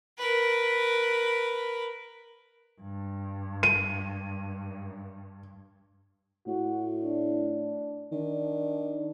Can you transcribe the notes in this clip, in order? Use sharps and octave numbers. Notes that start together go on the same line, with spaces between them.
A#4 B4
G2
D#7
A2 F#4
D4
D#3 D4